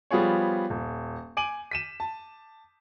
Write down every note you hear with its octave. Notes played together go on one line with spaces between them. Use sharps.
F3 G3 B3 F4 G#4 C#5
D#1
G#5 D6 D7 D#7 F#7
B6 D#7 E7
A5